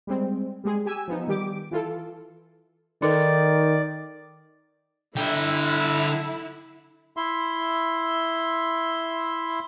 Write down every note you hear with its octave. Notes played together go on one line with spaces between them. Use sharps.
G3 G#3 C4
G3 G#3 G#4
G4 G#5 E6
F3 B3 D#4
D#3 G3 G4 D6 D7
E3 F4 A4
D#3 D#4 A4 B4 D5
D3 E4 G5
E4 E5 C6